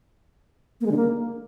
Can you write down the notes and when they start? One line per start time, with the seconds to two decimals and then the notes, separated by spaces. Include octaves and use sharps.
0.81 A#3
0.86 G#3
0.91 D3
0.97 A#3